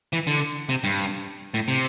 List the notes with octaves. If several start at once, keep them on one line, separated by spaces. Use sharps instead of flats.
E3
D3
C3
G2
A2
C3